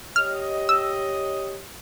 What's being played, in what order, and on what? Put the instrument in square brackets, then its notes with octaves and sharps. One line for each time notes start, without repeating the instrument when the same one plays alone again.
[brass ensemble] G4 C#5 D#5 [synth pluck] F6
[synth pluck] E6